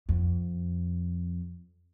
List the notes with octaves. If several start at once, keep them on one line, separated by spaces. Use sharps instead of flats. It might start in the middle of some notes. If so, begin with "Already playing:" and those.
F2